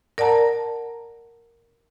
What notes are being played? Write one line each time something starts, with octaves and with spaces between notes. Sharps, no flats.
A#4 D5 F#5 A5 A#5